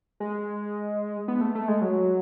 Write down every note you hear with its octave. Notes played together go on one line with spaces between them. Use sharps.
G#3
B3
A3
A3
G#3
F#3